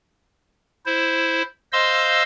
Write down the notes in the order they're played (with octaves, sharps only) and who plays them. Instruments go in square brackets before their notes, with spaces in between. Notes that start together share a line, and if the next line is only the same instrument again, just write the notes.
[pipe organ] E4 C5
C5 D#5 F5 C6 E6